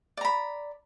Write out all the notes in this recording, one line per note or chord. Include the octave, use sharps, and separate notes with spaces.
D5 A#5 B5